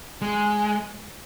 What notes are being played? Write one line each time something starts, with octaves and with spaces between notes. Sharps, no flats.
G#3